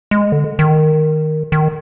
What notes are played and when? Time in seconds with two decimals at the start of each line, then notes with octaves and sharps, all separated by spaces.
0.11 G#3
0.32 D3
0.59 D#3
1.52 D#3